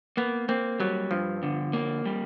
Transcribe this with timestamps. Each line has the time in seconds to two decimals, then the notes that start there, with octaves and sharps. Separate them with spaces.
0.17 A#3 B3
0.49 A#3 C4
0.80 F#3 G3
1.11 G2 F3
1.43 D3
1.73 A#3
2.05 G3